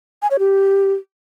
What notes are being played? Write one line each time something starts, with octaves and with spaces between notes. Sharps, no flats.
G#5
C#5
G4